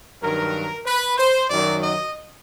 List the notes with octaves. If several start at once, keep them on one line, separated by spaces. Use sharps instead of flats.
G2 D#3 F#3 A#4
B4
C5
F#2 D#3 F#3 D5
D#5